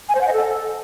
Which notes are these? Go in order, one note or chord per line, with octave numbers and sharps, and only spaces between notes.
G#5
C5
F#5
D#5
A4